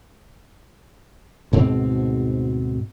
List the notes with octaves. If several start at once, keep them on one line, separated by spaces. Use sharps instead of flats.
D2 G#2 B2 C4